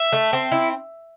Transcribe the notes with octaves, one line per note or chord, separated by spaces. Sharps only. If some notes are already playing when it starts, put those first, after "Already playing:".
Already playing: E5
A3
C4
E4